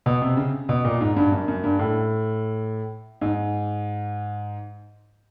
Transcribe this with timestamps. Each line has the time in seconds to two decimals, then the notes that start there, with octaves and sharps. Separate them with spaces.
0.06 B2
0.22 C3
0.37 C#3
0.69 B2
0.85 A#2
1.01 G#2
1.16 G2
1.32 F#2
1.48 F#2
1.64 G2
1.79 A2
3.21 G#2